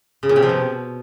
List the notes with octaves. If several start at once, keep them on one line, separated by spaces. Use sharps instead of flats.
C#3
A#2
C3
F3
B2